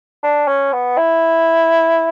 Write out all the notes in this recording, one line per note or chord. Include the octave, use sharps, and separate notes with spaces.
D4
C#4
B3
E4